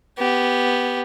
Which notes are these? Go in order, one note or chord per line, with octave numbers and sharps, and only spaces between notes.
B3 G4